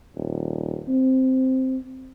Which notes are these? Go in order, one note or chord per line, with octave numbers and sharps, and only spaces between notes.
D#1
C4